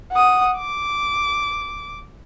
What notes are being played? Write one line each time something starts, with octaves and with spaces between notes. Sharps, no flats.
F#5 D#6
D6